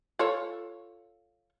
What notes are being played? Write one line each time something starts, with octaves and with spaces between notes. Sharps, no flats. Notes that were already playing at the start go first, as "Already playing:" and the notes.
F4 A4 C#5